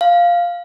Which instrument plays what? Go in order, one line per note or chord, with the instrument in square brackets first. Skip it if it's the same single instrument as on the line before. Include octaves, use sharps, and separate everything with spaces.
[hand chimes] F5